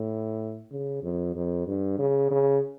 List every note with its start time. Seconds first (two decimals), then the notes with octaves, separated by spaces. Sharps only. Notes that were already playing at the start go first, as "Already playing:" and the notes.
Already playing: A2
0.72 C#3
1.03 F2
1.35 F2
1.67 G2
1.99 C#3
2.31 C#3